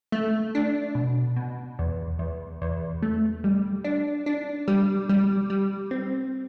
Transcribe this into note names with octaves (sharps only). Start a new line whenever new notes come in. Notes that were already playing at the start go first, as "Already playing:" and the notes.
A3
D4
B2
B2
E2
E2
E2
A3
G3
D4
D4
G3
G3
G3
C4